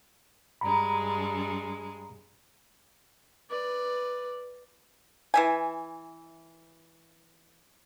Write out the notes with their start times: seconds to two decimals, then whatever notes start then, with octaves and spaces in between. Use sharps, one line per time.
0.61 G2 G#3 A#5 B5
3.50 B4 D5
5.34 E3 E5 G#5